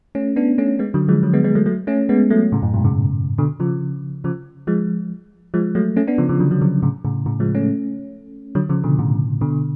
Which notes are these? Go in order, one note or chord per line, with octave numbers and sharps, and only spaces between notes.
A3 C#4
B3 D4
A3 C#4
G#3 B3
D3 F#3
F3 G#3
D3 F#3
G#3 B3
G#3 B3
F#3 A3
F#3 A3
A3 C#4
G#3 B3
F#3 A3
A2 C#3
F#2 A2
G#2 B2
A2 C#3
B2 D3
C#3 F3
C#3 F3
F3 G#3
F3 G#3
F#3 A3
A3 C#4
B3 D4
C#3 F3
C#3 F3
D3 F#3
F#3
C#3 F3
A2 C#3
A2 C#3
A2 C#3
F3 G#3
A3 C#4
D3 F#3
C#3 F3
B2 D3
A2 C#3
B2 D3